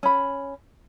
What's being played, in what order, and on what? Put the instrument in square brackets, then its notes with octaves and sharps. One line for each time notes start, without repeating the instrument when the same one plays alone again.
[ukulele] C#4 B5